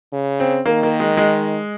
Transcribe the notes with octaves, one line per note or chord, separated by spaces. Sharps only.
C#3
C4
D#3 A#3
A#3
G#3
G#3